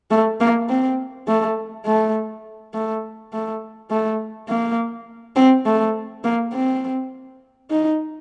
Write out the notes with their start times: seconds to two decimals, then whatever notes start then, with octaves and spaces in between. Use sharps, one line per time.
0.11 A3
0.41 A#3
0.69 C4
1.28 A3
1.86 A3
2.74 A3
3.33 A3
3.91 A3
4.49 A#3
5.36 C4
5.66 A3
6.24 A#3
6.53 C4
7.70 D#4